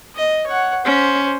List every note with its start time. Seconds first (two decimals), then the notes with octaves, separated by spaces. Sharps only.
0.15 D#5
0.47 C#5 F#5
0.85 C#4 C5